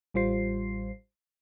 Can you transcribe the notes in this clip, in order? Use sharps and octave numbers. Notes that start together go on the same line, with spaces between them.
A1 G3 F4 C5 C7